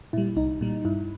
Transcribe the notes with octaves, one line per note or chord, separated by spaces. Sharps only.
A#2 G3 E4
C2 D#4
A#2 G3
G2 E4